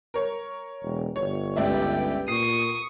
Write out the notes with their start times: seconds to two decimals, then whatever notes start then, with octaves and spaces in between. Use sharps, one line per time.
0.14 A#4 C#5
0.83 E1
1.16 G1 C#5
1.57 C#2 G4 B4 D5 E5
2.28 A#2 C#6 D#6 C7